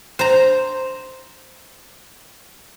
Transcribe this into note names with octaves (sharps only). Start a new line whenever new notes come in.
C5 A#5